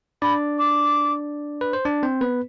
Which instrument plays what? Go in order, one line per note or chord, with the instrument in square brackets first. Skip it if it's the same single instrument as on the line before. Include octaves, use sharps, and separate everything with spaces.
[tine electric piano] D4 D5 [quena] B5
[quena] D6
[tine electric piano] B4
C5
D4 D5
C4 C5
B3 B4